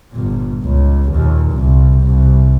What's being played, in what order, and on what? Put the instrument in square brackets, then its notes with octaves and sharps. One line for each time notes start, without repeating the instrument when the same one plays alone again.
[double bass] G1 A#2
C#2
D#2 A#2
C2
C2